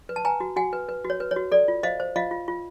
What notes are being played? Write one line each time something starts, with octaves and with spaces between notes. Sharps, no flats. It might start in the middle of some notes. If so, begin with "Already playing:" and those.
B4
A5
B4 G#5 A#5
F#4
F#4 F#5 G#5
B4
B4
F#4
C#5
B4
C#5
F#4
A4 D5
F4
C5 D#5 F5
C5
F4 D#5 F5
F4
F4